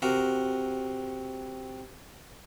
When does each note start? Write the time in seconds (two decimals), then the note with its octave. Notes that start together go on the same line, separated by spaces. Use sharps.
0.02 C3 F#4 A#4